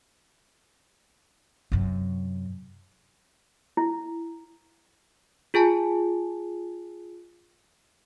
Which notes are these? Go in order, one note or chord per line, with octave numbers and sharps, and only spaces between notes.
F#2 C3
E4
F4 G#4 G#5 A5